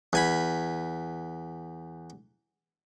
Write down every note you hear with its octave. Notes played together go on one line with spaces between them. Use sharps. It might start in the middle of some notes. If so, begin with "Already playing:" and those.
E2 G#5 B5